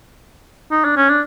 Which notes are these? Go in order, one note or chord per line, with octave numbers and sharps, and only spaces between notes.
D#4
D4
C#4
D4